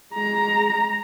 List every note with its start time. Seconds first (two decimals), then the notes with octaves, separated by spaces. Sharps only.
0.13 G#3 A#5